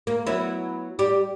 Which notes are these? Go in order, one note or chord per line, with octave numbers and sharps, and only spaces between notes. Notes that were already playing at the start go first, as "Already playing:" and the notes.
A#3
F#3 B3 E4
G3 G4